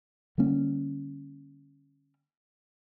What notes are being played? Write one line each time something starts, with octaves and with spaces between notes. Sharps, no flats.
D3 G3 A#3 C#4